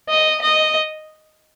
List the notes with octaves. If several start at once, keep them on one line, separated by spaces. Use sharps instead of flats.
D#5
D#5